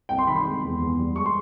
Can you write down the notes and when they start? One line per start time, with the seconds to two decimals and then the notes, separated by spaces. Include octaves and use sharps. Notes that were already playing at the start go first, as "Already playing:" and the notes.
0.09 C2 G5
0.19 C6
0.27 D#3 B5
0.36 C6
0.45 G#3
0.62 E2
0.80 E2
0.99 G3
1.16 G#3 C#6
1.26 C6